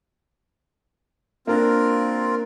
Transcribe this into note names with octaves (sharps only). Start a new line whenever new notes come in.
A#3 C4 D4 F4 A#4